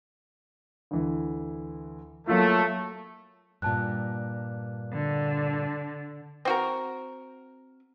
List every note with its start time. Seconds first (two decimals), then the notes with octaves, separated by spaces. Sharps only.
0.91 D2 E3
2.27 F#3 A3 A#3 F4
3.62 G2 A#2 A5 F#6
4.93 D3
6.45 C4 F#4 A#4